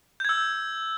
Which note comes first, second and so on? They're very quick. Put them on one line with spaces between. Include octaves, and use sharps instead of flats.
G6 G#6 E6